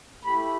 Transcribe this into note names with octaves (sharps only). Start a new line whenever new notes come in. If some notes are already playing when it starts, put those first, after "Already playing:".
A3 E4 G4 B5